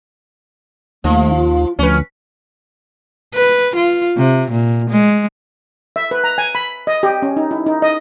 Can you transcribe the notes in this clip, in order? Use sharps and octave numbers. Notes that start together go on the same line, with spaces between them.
D#2 F3 A3
F4
D2 F3 C#4 B4
B4
F4
C3
A#2
G#3
E5
B4
A#5
G#5
B5
D#5
G4
C#4
D#4
E4
D#4
D#5